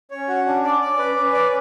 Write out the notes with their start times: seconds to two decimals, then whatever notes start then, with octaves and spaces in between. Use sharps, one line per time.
0.11 C#4 C#5
0.28 F#4
0.46 D4
0.64 D5
0.81 D5
0.98 B4
1.16 C#4 B4
1.33 D5